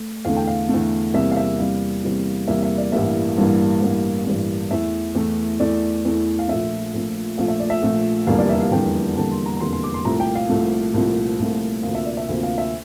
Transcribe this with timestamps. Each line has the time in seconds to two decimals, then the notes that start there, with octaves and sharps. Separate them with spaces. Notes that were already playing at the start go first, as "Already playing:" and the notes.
Already playing: A3
0.25 E2 D3 A3 F5
0.37 G5
0.47 F5
0.69 E2 D3 A3
1.14 E2 C3 G3 A#3 E5
1.31 F5
1.37 E5
1.59 E2 C3 G3 A#3 F5
2.04 E2 C3 G3 A#3
2.47 E2 C3 G3 A#3 E5
2.63 E5
2.78 D5
2.92 A1 G2 E3 G3 A#3 E5
3.37 A1 G2 E3 G3 A#3
3.81 A1 G2 E3 G3 A#3
4.26 A1 G2 E3 G3 A#3
4.71 E2 E3 A3 E5
5.15 E2 E3 A3
5.60 E2 E3 A3 D5
6.05 E2 E3 A3
6.39 F5
6.48 A#1 A#2 F3 A3 E5
6.94 A#1 A#2 F3 A3
7.38 A#1 A#2 F3 A3 F5
7.48 E5
7.60 D5
7.70 E5
7.82 A#1 A#2 F3 A3
8.27 F1 E2 D3 G3 A#3 F5
8.38 D5
8.49 E5
8.61 F5
8.71 F1 E2 D3 G3 A#3 G5
9.16 F1 E2 D3 G3 A#3 A5
9.31 C6
9.46 A#5
9.57 A#5
9.60 F1 E2 D3 G3 A#3 C6
9.73 C6
9.84 D6
9.94 C6
10.05 C2 A#2 F3 A3 A#5
10.20 G5
10.35 F5
10.49 C2 A#2 F3 A3
10.94 C2 A#2 F3 A3
11.40 C2 A#2 F3 A3
11.83 D2 C3 F3 A#3 F5
11.95 E5
12.06 D5
12.17 E5
12.28 D2 C3 F3 A#3 F5
12.43 F5
12.58 E5